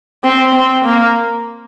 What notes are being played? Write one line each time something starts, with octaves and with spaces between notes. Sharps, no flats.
C4
C4
A#3